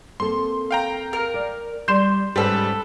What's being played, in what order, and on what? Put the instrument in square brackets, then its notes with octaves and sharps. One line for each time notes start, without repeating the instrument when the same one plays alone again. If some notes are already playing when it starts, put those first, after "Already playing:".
[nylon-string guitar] A#3 C4 A4 [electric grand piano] C6
[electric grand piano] F5 G5 A#5
[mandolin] A#4
[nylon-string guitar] D5
[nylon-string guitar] G3 D5 [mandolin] C6 [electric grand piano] G6 E7
[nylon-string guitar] G#2 C#4 C5 [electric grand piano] G3 [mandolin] A4 B4